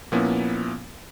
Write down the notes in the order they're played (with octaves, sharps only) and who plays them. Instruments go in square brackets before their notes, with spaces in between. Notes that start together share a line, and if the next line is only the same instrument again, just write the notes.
[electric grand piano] A#2 F3 A#3 B3 C#4 E4